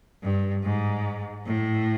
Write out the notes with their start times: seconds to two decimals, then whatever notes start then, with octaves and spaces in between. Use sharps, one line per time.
0.22 G2
0.64 G#2
1.46 A2